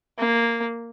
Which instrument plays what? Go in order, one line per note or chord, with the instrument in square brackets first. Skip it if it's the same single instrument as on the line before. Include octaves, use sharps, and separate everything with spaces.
[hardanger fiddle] A#3